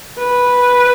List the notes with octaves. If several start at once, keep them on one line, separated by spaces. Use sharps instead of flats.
B4